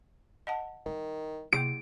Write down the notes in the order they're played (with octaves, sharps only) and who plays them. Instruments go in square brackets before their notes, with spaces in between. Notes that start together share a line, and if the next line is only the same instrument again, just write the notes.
[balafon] D#5 F#5 A5
[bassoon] D#3 [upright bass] G3 E4
[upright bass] C3 [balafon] A#3 E4 G#4 [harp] D7